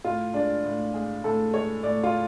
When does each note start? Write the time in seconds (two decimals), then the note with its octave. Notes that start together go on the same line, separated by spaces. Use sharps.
0.04 A2 F4
0.34 G#3 D4
0.65 A2
0.94 G#3 G#4
1.24 A2 A4
1.53 G#3 C#5
1.83 A2 D5
2.04 F4